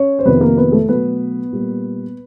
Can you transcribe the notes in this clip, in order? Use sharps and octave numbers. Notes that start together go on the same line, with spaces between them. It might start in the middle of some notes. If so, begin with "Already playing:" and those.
Already playing: C#4 C#5
C5
F2 C3 D#3 B3 B4
A#3 A#4
B3 B4
A3 A4
B2 F#3 A3 B3 B4
A#2 G3 A#3